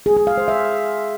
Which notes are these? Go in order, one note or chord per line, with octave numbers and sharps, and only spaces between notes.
G#4
G#4
F5
C5
E5